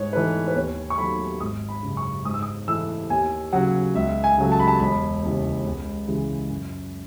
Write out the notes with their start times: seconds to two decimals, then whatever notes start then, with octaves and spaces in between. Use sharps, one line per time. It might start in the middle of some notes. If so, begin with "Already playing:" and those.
Already playing: G#2 C#5
0.13 E3 A3 D#4 B4
0.48 B4
0.56 D#2 C#5
0.90 C#6
0.98 D#3 F#3 A3 B5
1.40 G#1 D#6
1.69 B5
1.83 F#2 C#3
1.97 C#6
2.25 G#2 D#6
2.34 E6
2.43 D#6
2.68 E3 A3 E4 E6
3.10 D#2 G#5
3.53 C#3 F#3 F#5
3.95 C#2 E5
4.24 G#5
4.38 C#3 F#3 A3
4.52 A5
4.60 B5
4.68 A5
4.80 E1 B5
5.23 D#2 C#3 E3
5.65 C#2
6.08 C#3 E3 G#3
6.50 F#2